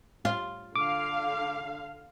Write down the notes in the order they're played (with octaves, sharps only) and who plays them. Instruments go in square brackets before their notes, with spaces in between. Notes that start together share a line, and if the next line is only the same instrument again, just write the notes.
[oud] F4
[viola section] D3 F5 [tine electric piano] D6